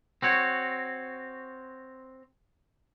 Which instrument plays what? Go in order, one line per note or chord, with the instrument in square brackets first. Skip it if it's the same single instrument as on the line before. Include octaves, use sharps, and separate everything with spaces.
[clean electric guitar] C4 F#4 C#5